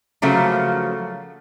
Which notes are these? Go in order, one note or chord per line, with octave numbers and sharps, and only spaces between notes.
C#3 F3 F#3 A3 A#3